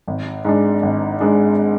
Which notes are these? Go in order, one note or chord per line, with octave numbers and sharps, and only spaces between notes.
G#1
G#2 G#3 D4
G#1
G#2 G#3 D4